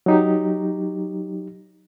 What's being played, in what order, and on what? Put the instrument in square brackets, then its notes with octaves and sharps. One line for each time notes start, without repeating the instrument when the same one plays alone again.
[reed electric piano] F#3 D#4 G4